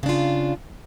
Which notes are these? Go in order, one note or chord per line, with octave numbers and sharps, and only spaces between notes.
C#3 D4 F4